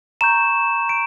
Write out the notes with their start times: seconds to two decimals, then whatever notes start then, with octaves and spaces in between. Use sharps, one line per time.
0.21 A#5 C#6 G6 E7
0.89 D7